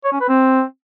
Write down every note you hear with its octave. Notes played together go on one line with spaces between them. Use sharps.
C#5
C#4
B4
C4